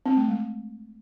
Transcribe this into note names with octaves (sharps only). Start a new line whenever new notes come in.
C4
A3
G#3